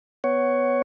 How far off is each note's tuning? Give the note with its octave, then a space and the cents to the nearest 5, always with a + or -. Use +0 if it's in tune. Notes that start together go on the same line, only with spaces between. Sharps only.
B3 +5 C#5 +0 F#5 +15